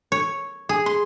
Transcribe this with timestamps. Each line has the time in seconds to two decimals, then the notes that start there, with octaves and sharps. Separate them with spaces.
0.12 C#5
0.69 G#4
0.86 C6